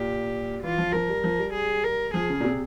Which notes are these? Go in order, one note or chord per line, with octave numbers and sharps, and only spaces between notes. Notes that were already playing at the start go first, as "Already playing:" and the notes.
Already playing: A#2 G4
E3 F4
F3
F3 A#4
G3
F3
G3
G#4
A#4
F3 G#4
C#3
A#2
C3